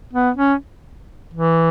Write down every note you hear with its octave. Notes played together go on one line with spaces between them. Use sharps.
B3
C#4
E3